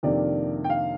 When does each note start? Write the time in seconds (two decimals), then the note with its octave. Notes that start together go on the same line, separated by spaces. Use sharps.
0.03 F2 C3 D#3 A#3 D4 D5
0.64 G5
0.70 F5